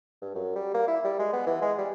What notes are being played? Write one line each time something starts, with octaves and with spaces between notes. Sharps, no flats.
G2
F#2
G3
A#3
E4
G3
G#3
B3
E3
G#3
G3